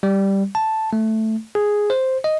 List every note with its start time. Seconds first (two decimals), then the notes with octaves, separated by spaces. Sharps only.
0.03 G3
0.55 A5
0.93 A3
1.55 G#4
1.90 C5
2.24 D#5